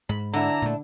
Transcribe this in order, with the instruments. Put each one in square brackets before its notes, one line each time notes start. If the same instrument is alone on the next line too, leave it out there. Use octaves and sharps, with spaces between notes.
[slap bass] G#2 [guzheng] B5
[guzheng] D3 [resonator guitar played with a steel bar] D4 E4 [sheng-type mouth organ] A#5
[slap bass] A#2 A3